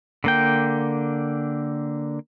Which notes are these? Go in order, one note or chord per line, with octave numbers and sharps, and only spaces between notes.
D3 A#3 G5